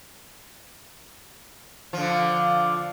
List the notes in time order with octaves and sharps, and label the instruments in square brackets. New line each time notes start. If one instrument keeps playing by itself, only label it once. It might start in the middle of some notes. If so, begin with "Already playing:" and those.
[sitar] D3 F3